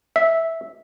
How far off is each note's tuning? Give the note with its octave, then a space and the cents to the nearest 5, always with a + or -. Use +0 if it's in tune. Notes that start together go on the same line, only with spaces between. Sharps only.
E5 -5